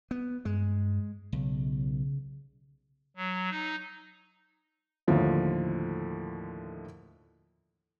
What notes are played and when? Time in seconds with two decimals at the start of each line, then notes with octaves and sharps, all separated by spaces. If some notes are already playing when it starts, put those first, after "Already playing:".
0.11 B3
0.45 G2 G#3
1.33 B1 C#3
3.16 F#3
3.50 D#4
5.08 D#2 A2 D3 F3 E4